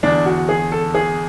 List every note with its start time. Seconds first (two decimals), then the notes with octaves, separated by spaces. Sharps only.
0.03 E2 D3 D4
0.26 F#4
0.49 G#4
0.72 A4
0.95 G#4